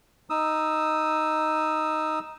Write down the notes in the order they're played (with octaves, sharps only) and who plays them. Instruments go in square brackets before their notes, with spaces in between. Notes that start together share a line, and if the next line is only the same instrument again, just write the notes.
[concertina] D#4 D#6 E6